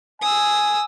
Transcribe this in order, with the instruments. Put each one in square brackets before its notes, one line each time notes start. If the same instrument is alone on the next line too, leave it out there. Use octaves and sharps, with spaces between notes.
[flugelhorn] G#5 [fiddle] D#6 E6